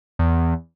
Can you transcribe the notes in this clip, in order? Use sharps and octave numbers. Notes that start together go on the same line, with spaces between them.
E2